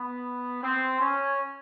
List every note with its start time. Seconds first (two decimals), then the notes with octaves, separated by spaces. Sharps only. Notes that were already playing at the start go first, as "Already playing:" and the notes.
Already playing: B3
0.63 C4
1.01 C#4